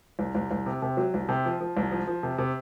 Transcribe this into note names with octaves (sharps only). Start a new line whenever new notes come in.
C2
C2
C2
C3
C3
F#3
C2
C3
F3
F3
C2
F3
F3
C3
C3